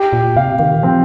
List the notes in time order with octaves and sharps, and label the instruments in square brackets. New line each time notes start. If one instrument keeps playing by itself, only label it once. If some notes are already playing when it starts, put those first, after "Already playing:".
Already playing: [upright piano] G4
[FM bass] A#2
[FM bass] C3 [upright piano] F5
[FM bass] D#3
[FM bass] F3 [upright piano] C4